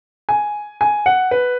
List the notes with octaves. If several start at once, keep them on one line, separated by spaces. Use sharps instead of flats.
G#5
G#5
F#5
B4